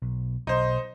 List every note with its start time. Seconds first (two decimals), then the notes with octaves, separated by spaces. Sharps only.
0.02 B1
0.47 B1 D#4 C5